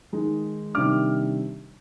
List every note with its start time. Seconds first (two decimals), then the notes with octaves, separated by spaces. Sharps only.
0.13 D#3 G#3 D#4
0.75 C3 D#3 G3 D4 D6 F6